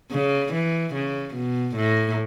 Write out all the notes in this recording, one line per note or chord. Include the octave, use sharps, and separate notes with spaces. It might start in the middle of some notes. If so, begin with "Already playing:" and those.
C#3
E3
C#3
B2
A2